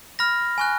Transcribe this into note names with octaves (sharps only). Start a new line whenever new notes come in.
B5 F6 A#6
G#5 C#6 F#6